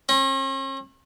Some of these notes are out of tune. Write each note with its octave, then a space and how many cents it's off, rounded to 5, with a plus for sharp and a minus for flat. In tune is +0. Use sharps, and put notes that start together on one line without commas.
C#4 -45